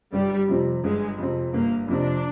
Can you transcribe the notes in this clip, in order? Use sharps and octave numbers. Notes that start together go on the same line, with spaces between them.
G1 G3
F2 C3 F3 C4
G1 G#3
F2 C3 F3 C4
G1 A#3
F2 C3 F3 C4 D4